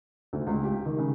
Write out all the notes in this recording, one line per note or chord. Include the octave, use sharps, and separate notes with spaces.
D2
C#2
G4
D#3
C#3